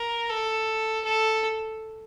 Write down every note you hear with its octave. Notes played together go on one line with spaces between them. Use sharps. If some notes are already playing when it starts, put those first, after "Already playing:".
Already playing: A#4
A4
A4